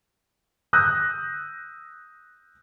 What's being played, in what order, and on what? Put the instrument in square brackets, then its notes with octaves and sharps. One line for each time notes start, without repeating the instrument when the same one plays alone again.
[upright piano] D#6 E6 F#6 G6 A#6